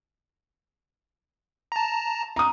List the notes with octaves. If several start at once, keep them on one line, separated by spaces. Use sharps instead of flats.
A5 A#5
A#5 D#6